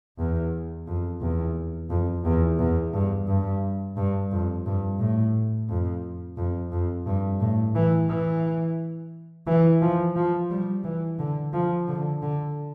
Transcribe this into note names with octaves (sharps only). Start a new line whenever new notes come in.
E2
F2
E2
F2
E2
E2
G2
G2
G2
F2
G2
A2
F2
F2
F2
G2
A2
E3
E3
E3
F3
F3
G3
E3
D3
F3
D3
D3